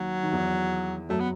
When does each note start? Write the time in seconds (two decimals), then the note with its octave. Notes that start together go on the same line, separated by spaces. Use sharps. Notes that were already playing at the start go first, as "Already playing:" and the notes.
Already playing: D#2 D#3 F#3
0.23 D#3
0.32 E2 E3
1.09 F#2 F#3 A3
1.20 B3